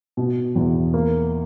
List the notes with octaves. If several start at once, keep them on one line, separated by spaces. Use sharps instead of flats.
B2
E2
A#3